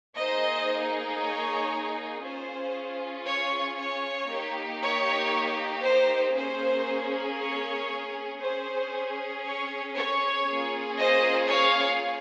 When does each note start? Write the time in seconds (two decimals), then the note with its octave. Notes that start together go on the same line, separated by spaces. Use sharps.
0.17 A#3 D#4 G#4 C5 D#5
1.21 C#5
2.23 C#4 F4 G#4 C5
3.26 C#5
3.77 C#5
4.29 A#3 D#4 G4
4.80 C#5
5.84 C5
6.35 A#3 C#4 G#4 C5
7.38 C#5
8.40 C#4 G#4 C5
9.44 C#5
9.95 C#5
10.46 A#3 C#4 F4 G#4
10.98 C5 D#5
11.49 C#5 F5